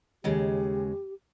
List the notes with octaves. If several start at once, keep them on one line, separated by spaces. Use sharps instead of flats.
D#2 C#3 G#3 G4